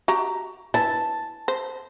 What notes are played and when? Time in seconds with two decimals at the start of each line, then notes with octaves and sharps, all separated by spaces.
0.08 F#4 G4 A#5
0.74 E4 B4 A5
1.48 C5